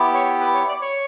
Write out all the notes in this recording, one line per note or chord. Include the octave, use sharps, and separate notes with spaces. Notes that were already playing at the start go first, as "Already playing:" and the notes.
Already playing: B3 E4 G4
C#5
B4
C#5
D5
C#5